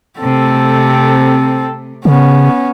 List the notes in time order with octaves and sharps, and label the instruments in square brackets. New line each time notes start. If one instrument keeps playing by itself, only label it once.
[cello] C3 A3 [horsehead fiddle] C4 A4
[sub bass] C#3 [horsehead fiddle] B3 C#4